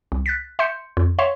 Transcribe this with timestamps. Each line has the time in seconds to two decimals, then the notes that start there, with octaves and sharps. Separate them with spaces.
0.12 C2
0.26 F#6 A6 B6
0.59 E5 C6 G6 C#7
0.97 F2
1.19 C#5 E5 F5 C6 C#6